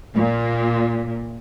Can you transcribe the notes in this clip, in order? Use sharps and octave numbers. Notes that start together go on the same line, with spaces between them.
A#2